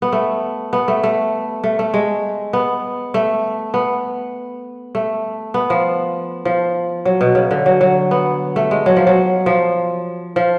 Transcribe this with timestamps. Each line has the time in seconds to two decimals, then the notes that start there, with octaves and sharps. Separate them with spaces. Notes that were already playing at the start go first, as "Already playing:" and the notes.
0.02 B3
0.12 A3
0.73 B3
0.88 A3
1.03 A3
1.64 A3
1.79 A3
1.94 G#3
2.53 B3
3.14 A3
3.74 B3
4.95 A3
5.54 B3
5.70 F3
6.45 F3
7.05 F#3
7.21 B2
7.35 C#3
7.51 D3
7.66 F#3
7.81 F#3
8.11 B3
8.56 A3
8.71 G#3
8.86 F#3
8.96 F3
9.07 F#3
9.46 F3
10.36 F3